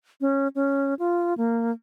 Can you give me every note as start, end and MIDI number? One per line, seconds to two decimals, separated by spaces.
0.21 0.48 61
0.55 0.94 61
0.99 1.34 65
1.38 1.72 58